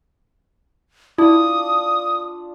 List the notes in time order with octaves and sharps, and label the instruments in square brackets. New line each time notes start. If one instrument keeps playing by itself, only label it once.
[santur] D4 F4 [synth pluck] E4 [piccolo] D#6